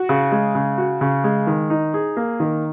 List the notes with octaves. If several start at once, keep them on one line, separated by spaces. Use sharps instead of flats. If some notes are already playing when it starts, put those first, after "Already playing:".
Already playing: F#4
C#3
G#3
C#3
F#4
C#3
G#3
D#3
D#4
G#4
A#3
D#3